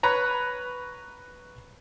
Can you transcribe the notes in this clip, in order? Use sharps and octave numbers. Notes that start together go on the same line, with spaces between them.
B4 C#5 A#5